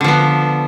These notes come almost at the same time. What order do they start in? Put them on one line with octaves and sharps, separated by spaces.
D3 F3 B3